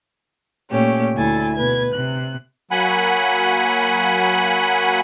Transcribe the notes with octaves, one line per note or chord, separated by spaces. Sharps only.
A#2 A3 C#4 G4
D2 E4 A4 G#5 A6
B2 B4 G#6
C3 F#6
F#3 A#3 F#5 G#5 B5